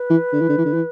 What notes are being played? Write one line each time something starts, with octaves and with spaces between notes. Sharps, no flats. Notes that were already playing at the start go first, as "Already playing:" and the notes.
Already playing: B4
E3
D3
E3
D3
E3
D3
E3